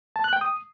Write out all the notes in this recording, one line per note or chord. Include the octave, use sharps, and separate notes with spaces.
A5
F#6
G5
D#6